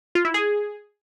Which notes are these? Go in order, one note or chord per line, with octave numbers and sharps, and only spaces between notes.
F4
E4
G#4